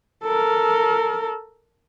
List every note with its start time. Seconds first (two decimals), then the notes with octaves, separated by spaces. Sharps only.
0.24 A4 A#4